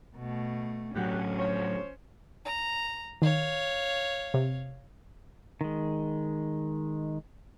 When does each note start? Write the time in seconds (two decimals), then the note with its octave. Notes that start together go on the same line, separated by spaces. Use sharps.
0.16 B2 A3
0.96 A2 F#3 C#4 G4 F#5
1.38 F3 C5 C#5
2.45 A#5
3.22 D#3 C#5 F5
4.34 C3
5.61 D#3 G#3